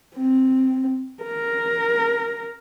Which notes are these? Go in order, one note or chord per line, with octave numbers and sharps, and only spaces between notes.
C4
A#4